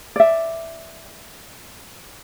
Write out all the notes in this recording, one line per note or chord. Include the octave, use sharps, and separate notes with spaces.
D5 E5